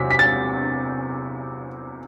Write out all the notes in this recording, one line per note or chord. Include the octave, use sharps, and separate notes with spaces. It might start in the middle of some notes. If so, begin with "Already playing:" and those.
Already playing: E2 C3 F#3 B6
B6
A6